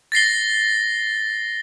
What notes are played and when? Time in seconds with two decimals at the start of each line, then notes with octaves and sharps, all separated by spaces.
0.12 A6 A#6 C7 G7